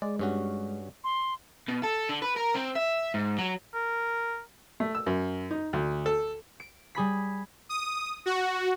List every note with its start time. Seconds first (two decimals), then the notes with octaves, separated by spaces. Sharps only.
0.02 G#3 D5
0.19 G2 C#4 F#4
1.04 C6
1.69 B2
1.84 A4
2.09 D3
2.22 B4
2.36 A#4
2.54 C4
2.75 E5
3.14 G#2
3.38 F#3
3.74 A#4
4.80 A3
4.95 E6
5.06 F#2
5.51 D#4
5.73 D2
6.06 A4
6.60 D7
6.95 G3 G#4 B5 B6
7.69 D#6
8.26 F#4